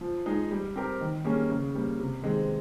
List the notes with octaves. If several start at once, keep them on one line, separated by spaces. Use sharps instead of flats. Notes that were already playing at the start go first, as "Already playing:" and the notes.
F3
G#3 D#4 G#4
G3
C4 G4 A#4
D#3
G3 A#3 C#4 G#4
C#3
G3 A#3
C3
D#3 G#3 C4